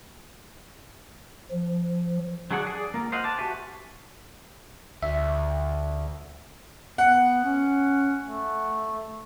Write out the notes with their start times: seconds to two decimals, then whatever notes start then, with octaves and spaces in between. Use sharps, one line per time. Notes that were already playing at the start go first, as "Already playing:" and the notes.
1.52 F3
2.51 F#3 D4 G#4 D5 F#5
2.67 G#4 D5
2.94 A#3 F4
3.12 C5 D#5 F5 F#5
3.24 A5 D6
3.39 F#4 G4 B4 E5 G#5
5.03 D2 E5
6.98 B3 F#5
7.44 C#4
8.23 A3